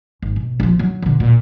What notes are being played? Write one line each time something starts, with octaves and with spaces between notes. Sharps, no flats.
G#1
B2
A#1 F3
F#3
B2 D3
A#2